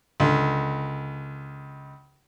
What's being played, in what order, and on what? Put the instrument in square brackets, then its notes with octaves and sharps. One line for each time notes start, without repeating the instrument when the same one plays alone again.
[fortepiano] C#2 D3